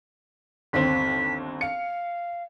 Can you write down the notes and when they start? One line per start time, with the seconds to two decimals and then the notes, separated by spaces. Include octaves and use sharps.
0.73 G1 D#2 C4 B6
1.61 F5 C#7